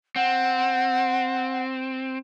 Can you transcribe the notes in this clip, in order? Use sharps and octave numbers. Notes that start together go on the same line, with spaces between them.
C4 F#5